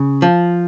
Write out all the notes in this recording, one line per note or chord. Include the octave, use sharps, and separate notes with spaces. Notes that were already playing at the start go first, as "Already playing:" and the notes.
Already playing: C#3
F3